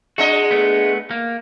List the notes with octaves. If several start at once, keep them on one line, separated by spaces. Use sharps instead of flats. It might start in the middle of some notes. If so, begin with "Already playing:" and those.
G#3 D4 F#4 D#5
A3 B3
A#3